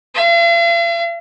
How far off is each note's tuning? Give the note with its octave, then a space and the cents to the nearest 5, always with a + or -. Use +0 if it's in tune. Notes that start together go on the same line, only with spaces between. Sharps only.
F5 -45